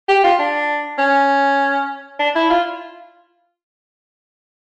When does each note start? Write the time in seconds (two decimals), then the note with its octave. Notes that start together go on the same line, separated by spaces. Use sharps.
0.08 G4
0.24 F4
0.39 D4
0.99 C#4
2.19 D4
2.35 E4
2.50 F4